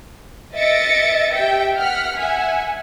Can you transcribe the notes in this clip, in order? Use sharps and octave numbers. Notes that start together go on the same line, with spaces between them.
D#5 E5 A6 A#6 C#7 D7
G4 E5 G5
F#5 F6 B6
E5 F#5 G#5